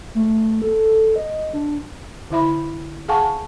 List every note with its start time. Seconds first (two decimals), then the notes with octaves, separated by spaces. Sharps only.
0.15 A3
0.62 A4
1.16 D#5
1.53 D4
2.31 D3 E4 E5 B5
3.08 G#4 F5 F#5 G#5 A5 C#6